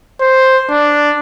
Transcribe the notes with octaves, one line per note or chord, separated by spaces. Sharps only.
C5
D4